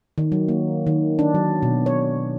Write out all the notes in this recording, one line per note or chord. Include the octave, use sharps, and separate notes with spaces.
D#3
F#3
A#3
D#3
D4
F#3
B2
C#5